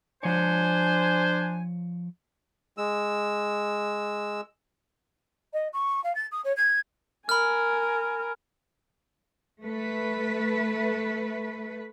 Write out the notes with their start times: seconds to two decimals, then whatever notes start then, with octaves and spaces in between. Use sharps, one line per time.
0.23 F3 D4 C5 C#5 G#5
2.78 G#3 E6
5.53 D#5
5.73 C#6
6.03 F5
6.15 A6
6.31 D#6
6.44 C#5
6.56 G#6
7.29 A#4 G#5 B5 F6
9.62 A3 B4